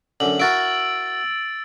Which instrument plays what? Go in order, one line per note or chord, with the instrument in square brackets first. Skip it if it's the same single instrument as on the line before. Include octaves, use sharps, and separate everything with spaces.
[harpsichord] F#2 D3 [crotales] F#7
[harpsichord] E4 F#4 A#4 [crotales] E6 A6 D7